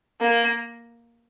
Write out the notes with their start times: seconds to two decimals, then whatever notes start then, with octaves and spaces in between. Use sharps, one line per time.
0.20 A#3